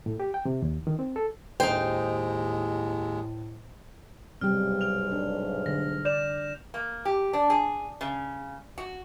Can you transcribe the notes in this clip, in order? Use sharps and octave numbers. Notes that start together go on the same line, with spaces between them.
A2
G4
G5
C3
D#2
D#3
C4
A4
D#2 A2 G#3 D#4 C5 G5
B1 G#2 C3 G3 G4 F6
F6 F7
D4
D3 A#6
D5 G6 E7 F7
A#3
G4
D4
G#4
C#3
F#4